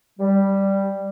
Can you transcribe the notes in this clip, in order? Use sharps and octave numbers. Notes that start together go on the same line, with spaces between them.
G3